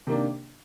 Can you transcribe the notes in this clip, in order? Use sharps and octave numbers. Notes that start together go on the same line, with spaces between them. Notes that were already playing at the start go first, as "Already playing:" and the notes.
C3 D#3 A#3 D4